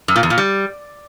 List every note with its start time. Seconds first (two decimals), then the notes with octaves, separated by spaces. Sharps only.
0.08 F#2
0.16 A#2
0.23 E2
0.30 A#2
0.38 G3